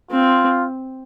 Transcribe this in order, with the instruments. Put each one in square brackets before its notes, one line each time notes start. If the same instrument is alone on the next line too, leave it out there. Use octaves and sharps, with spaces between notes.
[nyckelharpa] C4 [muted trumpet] F4